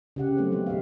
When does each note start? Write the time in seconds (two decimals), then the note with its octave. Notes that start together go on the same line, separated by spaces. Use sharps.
0.16 C#3 G4 F#5
0.37 F#3 A3 B3 C4 C5
0.52 D#3 G3 G#3 B3 A4
0.66 B2 G#3 G4 E5 F5